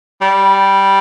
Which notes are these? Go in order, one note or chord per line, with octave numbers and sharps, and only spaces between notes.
G3